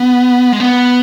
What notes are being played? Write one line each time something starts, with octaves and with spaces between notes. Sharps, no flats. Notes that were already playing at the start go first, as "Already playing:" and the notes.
Already playing: B3
G#3
B3